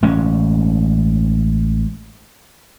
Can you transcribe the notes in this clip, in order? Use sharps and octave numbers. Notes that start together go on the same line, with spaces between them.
A1 G#3 C#4